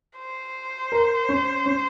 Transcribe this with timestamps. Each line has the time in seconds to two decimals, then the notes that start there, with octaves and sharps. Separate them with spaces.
0.18 C5
0.92 A#4
1.29 C#4
1.66 C#4